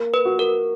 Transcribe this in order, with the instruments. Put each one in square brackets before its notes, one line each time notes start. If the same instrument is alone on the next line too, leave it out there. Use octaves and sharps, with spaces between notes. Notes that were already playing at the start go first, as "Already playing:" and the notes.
Already playing: [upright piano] A#3
[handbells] B4
[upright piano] F#4
[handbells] A#4